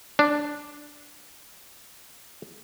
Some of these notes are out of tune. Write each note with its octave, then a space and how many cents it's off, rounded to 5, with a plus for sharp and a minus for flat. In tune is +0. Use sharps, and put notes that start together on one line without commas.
D4 +0